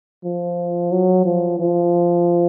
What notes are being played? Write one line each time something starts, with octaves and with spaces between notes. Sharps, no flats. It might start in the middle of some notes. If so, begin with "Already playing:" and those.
F3
F#3
F3
F3